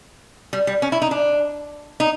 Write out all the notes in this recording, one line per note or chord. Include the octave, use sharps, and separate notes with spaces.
G3
G3
C#4
E4
D#4
D4
D#4